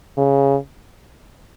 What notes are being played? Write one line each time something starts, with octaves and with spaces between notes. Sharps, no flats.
C#3